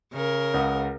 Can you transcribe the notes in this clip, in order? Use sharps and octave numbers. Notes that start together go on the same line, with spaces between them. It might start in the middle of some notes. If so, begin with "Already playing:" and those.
C#3 A#4
C#2 F#5 D#6